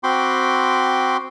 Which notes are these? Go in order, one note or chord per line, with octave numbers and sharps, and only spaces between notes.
C4 F#4 G5 B5 C6 D6